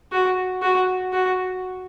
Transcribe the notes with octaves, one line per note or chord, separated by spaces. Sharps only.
F#4
F#4
F#4